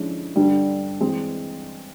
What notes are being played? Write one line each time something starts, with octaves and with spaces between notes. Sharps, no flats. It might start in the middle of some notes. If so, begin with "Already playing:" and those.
Already playing: D3 F3 G#3 C#4 E4
G2 D3 G3
E3 G#3 C4